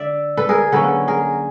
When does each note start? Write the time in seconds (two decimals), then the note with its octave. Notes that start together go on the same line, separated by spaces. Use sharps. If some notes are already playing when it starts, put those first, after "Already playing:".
Already playing: D3 D5 E5
0.37 A4 B4
0.49 G#4 A#4
0.72 D3 F#3 A#3 C#4 A4 B4
1.08 G#4 A#4